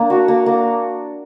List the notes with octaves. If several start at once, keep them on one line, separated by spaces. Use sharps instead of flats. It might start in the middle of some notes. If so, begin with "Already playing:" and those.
Already playing: A#3 D4
F#4
A#3
A#3